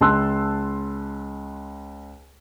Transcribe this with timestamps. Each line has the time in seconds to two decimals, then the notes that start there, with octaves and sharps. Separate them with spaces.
0.01 C#2 A5 C6 E6 F#6